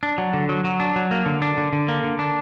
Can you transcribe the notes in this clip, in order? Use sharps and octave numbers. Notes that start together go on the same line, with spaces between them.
D4
F#3
D3
F#3
F#3
D4
F#3
A#3
D3
D4
D3
D3
A#3
D3
D4